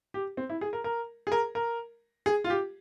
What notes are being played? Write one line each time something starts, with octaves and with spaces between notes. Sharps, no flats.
G4
C4
E4
G#4
A#4
A#4
G#4
A#4
A#4
G#4
F4
G4